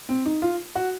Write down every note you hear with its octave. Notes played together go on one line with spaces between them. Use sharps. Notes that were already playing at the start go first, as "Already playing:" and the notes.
C4
D#4
F4
F#4